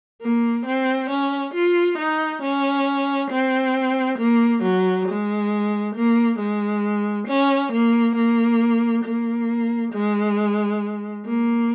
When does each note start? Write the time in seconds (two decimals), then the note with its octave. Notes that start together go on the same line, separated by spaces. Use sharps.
0.22 A#3
0.66 C4
1.10 C#4
1.54 F4
1.98 D#4
2.42 C#4
3.31 C4
4.19 A#3
4.63 F#3
5.08 G#3
5.95 A#3
6.39 G#3
7.28 C#4
7.73 A#3
8.16 A#3
9.04 A#3
9.92 G#3
11.26 A#3